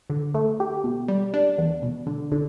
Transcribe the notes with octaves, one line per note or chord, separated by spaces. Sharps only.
D3
A3
G4
B2
G3
D4
E2
B2
D3
D3